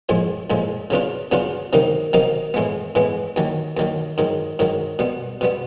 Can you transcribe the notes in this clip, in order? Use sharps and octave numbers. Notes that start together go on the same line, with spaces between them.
A#1 A2 F3 G#3
A#1 A2 F3 G#3
C#3 F#3 B3 D4 F4
C#3 F#3 B3 D4 F4
C3 D#3 F#3 A#3 D#4
C3 D#3 F#3 A#3 D#4
A2 E3 G#3 B3
A2 E3 G#3 B3
D#2 D#3 F#3
D#2 D#3 F#3
G#2 D#3 F#3
G#2 D#3 F#3
B2 G3 B3
B2 G3 B3